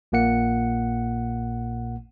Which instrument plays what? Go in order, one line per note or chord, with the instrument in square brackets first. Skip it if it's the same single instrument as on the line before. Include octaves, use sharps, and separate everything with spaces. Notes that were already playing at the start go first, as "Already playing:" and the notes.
[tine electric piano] A#1 A#2 A#3 F#5 C#7